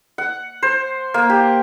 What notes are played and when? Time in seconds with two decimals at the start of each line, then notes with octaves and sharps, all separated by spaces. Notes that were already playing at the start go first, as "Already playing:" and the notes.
0.18 F#5
0.63 C5
1.14 A#3
1.30 G4